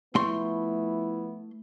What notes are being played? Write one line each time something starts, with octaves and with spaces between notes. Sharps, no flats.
F3 A3 B3 E4 C6